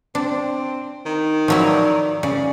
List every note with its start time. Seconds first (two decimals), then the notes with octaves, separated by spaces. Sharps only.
0.15 C4 D4
1.06 D#3
1.48 F3 F#3 E4 D5
2.23 C#3 G#4 D5